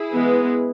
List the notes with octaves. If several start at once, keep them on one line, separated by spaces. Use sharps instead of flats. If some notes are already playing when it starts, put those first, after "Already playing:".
Already playing: E4 G#4
E3 G#3 B3